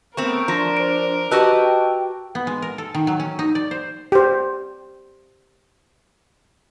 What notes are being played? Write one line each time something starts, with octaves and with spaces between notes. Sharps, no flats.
A3 B3 C4 A#4 C#6
F3 D4 A#5 A#6
C5 D7
F#4 G4 B4 D#5 A5 E6
G5
B3
G#3
A#4
A4
D#3
F#3
C#4
D#4
D5
C5
G4 C5